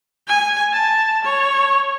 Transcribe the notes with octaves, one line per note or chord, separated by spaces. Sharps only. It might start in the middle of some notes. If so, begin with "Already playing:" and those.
G#5
A5
C#5